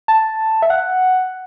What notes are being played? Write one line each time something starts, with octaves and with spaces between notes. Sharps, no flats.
A5
E5
F#5